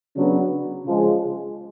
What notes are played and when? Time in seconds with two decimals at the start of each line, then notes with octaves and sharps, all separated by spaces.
0.16 C#3 F#3 B3 D4
0.85 C#3 F3 G#3